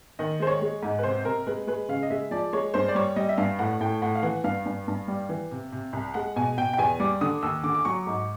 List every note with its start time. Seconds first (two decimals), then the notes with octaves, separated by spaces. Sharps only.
0.19 D#3 D#5
0.40 G#3 C5
0.47 C#5
0.61 G#3
0.83 G#2
0.99 B4
1.03 C3 C5
1.25 C3 A#4
1.47 G#3 B4
1.67 G#3 B4
1.88 C#3 F5
2.03 D#5
2.10 G#3 E5
2.31 F3 D5
2.53 G#3 C#5
2.74 G2 C5
2.88 D5
2.95 G3 C#5
3.16 G3 D#5
3.29 E5
3.37 G2 F5
3.59 A2 F#5
3.81 A2 G5
4.02 A2 F#5
4.15 F5
4.23 E3 F#5
4.44 G2 F5
4.65 G2
4.88 G2
5.08 G3
5.29 E3
5.51 C3
5.72 C3
5.93 C2
6.14 G#3 F#5
6.36 B2 G#5
6.57 B2 G5
6.73 G5
6.78 E2 G#5
7.00 G3 D6
7.21 D3 D#6
7.43 D#2 E6
7.63 D3 D6
7.74 D6
7.85 F#3 C#6
8.07 G#2